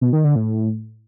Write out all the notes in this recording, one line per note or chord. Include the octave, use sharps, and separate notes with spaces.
B2
D#3
D3
A2